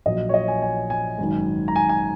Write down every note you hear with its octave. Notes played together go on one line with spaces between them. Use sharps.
A#1 A#2 F#3 D#5
C#5
D#5
G#5
G#5
G#5
G#1 F#2 D#3
A#5
G#5
G#5